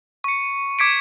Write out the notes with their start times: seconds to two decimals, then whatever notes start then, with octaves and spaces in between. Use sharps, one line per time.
0.24 C#6 C#7
0.79 D6 G#6 B6 C#7 D7